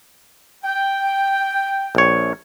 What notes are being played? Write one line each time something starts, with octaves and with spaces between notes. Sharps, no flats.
G5
A#1 C#5